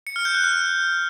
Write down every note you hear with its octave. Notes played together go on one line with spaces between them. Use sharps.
C#7
F6
G6
F#6
F6